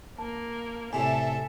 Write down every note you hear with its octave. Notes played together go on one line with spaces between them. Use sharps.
A#3 A5
A2 C3 G3 A4 E5 G#5